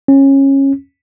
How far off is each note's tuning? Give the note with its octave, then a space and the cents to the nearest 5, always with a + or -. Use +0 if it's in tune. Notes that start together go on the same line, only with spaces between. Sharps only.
C#4 -20